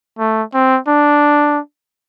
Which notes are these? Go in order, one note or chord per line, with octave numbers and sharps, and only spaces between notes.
A3
C4
D4